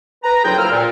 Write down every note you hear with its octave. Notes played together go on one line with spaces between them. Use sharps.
B4 A#5
D2 F#3 E4 F4 G#4 G5
A#3 A#4 C5 A#5 E6 F6
A#2